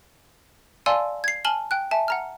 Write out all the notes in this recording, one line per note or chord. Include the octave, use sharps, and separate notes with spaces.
D5 F5 G#5 A5 C6 E6
G#6 C7
G#5 A5 F6 F#7 G7
G5 F#6
E5 G#5 A5
F#5 A#5 F6